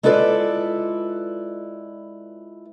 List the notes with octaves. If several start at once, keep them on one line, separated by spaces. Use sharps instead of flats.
G#3 E4 F4 A4 B4 D5